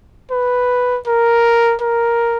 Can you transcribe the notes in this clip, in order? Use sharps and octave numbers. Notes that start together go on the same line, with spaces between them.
B4
A#4
A#4